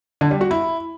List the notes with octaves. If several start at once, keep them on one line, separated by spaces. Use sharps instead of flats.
D3
G3
F#4
E4